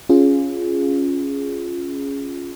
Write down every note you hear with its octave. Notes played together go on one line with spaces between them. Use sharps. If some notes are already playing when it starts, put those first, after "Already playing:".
C#4 F4 G#4